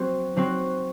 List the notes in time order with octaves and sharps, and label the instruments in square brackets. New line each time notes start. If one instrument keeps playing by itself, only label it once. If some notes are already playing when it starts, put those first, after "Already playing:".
Already playing: [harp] F#3 C4 F#4
F#3 C4 F#4